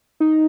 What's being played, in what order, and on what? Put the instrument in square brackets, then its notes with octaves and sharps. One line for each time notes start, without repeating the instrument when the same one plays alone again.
[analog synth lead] D#4